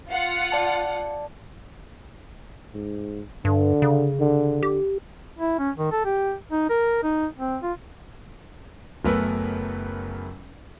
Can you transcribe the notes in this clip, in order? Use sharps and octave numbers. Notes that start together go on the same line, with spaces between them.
F4 F#5
D5 A5
G#2
G2 D3
C#3
D3
G4
E4
C#4
D#3
A4
G4
D#4
A#4
D#4
C4
F4
F#1 F#2 A3 B3 A#4 B4